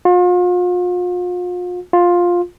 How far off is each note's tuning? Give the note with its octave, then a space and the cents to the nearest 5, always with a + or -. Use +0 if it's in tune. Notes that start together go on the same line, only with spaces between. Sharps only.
F4 +40
F4 +10